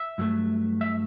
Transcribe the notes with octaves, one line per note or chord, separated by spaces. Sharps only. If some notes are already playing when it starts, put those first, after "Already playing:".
Already playing: E5
G2 F#3 A3
E5